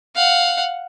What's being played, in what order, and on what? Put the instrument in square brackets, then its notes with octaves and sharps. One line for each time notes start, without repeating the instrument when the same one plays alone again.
[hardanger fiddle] F5 F#5